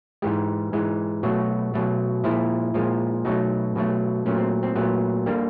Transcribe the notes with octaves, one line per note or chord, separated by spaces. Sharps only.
G#2 E3 G#3 G4
G#2 E3 G#3
B2 F#3 A3 F#4
B2 F#3 A3
A#2 F3 G#3 E4
A#2 F3 G#3
B2 F#3 A3 D#4
B2 F#3 A3
A#2 F#3 A3 C#4
C4
C4
A#2 F#3 A3 B3
D3 G3 A#3